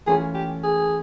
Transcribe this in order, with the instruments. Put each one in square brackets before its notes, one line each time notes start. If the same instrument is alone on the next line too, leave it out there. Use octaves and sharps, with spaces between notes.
[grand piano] E3 A3 C#4 F4 [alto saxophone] G#4
[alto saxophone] G4
G#4